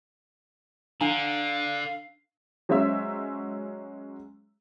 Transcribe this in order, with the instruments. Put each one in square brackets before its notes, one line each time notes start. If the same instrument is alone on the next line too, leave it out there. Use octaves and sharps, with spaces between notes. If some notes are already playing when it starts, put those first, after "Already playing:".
[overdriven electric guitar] D3 [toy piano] D4 A#5 [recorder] F5
[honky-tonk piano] F#3 G#3 C#4 C5 E5 E6